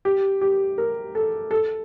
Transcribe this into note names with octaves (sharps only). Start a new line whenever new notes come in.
G4
G4
A#4
A4
A4